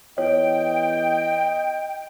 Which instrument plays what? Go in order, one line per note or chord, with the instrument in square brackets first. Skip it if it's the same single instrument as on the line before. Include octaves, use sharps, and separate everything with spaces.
[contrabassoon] E2 [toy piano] C#5 [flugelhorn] D#5 [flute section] G5